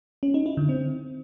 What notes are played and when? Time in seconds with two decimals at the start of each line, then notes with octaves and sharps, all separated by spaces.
0.23 C#4
0.34 D#4
0.46 E4
0.57 D3
0.69 C4